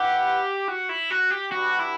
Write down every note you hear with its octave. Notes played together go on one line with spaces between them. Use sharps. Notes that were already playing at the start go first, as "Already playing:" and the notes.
Already playing: E4 G4 B4 F#5
F#4
E4
F#4
G4
G3 D4 F#4 G4 B4 F#5
E4